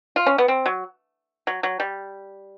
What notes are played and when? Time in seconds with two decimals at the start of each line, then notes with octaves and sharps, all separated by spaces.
0.16 F4
0.26 C#4
0.38 B3
0.48 C4
0.66 F#3
1.47 F#3
1.63 F#3
1.80 G3